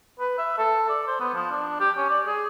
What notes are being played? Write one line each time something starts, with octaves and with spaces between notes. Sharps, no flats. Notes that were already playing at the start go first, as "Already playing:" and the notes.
B4
E5
A4
D5
C5
B3
F3
D4
G4
C#4
D5
G#4